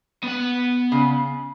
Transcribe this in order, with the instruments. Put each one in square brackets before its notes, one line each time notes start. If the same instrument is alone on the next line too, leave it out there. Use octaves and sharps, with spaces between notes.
[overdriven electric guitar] B3 F#5
[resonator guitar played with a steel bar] C#3